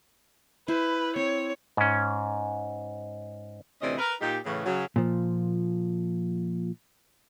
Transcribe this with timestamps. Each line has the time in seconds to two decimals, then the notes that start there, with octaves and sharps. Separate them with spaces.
0.68 E4 B4 C5
1.16 C4 C#5
1.77 G#2 C#4
3.81 D2 C3 E3 C#4 D5 D#5
3.98 A#4 B4
4.21 A#2 D#4 G4
4.45 A2 C#3 E3
4.66 C#3 F#3
4.96 A#2 F3